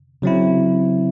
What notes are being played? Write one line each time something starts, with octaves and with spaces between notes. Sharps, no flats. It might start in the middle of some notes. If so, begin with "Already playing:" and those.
C#3 F#3 C4 E4